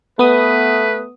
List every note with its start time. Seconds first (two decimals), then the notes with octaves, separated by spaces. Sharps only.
0.19 A3 B3 B4 D#6